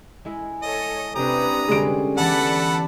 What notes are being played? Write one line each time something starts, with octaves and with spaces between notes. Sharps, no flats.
G#3 E4 G#4
A4 C#5 D#5
C3 D4 G4 B4 A#5 D#6
D3 G3 G#3 C#4 D7
E3 B3 A4 B4 D5 F#5 A5 B5